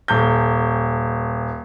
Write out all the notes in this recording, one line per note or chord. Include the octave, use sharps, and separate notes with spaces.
D#1 G6